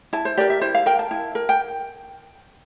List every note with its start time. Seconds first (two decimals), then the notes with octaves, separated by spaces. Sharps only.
0.13 E4 A5
0.25 C5
0.37 G4 A#4 D5
0.50 E5
0.61 E4 C5
0.75 F5
0.86 A#4 G5
0.99 A5
1.11 E4
1.35 A#4
1.49 G5